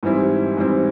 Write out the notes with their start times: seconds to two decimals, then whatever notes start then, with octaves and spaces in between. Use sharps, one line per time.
0.03 G#2 E3 G3 C4 E4
0.57 G#2 E3 G3 C4 E4